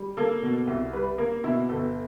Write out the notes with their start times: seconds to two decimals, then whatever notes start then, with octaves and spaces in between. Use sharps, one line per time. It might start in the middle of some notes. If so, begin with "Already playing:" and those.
Already playing: G3
0.17 A#3 A4
0.43 B2
0.67 C2
0.93 G3 B4
1.18 A#3 A#4
1.44 B2 E4
1.69 G1 A4